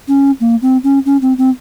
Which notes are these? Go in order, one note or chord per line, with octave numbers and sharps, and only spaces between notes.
C#4
A#3
C4
C#4
C#4
C4
C4